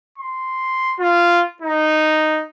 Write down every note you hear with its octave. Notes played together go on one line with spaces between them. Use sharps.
C6
F4
D#4